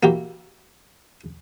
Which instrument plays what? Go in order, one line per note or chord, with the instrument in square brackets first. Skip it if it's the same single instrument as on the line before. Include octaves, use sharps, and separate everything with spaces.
[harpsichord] A#3 E4 F#4 G4